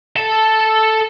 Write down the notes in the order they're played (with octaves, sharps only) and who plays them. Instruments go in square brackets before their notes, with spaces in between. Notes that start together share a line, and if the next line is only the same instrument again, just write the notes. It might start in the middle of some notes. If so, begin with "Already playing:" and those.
[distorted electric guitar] A4 A5